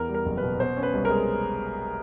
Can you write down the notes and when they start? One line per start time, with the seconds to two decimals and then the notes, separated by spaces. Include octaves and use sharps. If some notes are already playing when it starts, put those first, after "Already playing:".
Already playing: E2 E3 A#4
0.09 G3
0.14 A#4
0.26 F#1
0.37 B4
0.43 B2
0.59 B2 C5
0.77 C#4
0.83 B4
0.93 C2
1.05 A#4
1.10 G#3